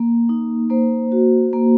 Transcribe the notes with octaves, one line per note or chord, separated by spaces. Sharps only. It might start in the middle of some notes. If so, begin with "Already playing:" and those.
Already playing: A#3
D#4
A#3 C5
F#4
A#3